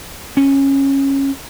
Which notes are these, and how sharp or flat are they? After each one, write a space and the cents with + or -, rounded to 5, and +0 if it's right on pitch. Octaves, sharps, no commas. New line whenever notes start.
C#4 -15